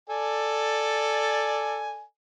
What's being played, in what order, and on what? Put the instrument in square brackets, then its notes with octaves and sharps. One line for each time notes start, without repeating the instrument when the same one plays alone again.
[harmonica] A4 D5 G#5